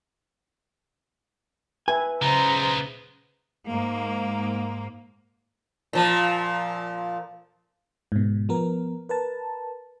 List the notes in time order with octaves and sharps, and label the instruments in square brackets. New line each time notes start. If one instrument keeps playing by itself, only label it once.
[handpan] B4 E5 [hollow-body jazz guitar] G#5
[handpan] C#3 [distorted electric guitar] B3 D#4 [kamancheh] C5 A#5
[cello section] G#2 A#3
[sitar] A#2 F3
[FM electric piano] G#2 B2
F3 B3 A#4
A#4 B4 A5